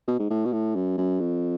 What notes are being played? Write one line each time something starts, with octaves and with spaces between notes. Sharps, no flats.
B2
G#2
A2
B2
A2
F#2
F#2
F2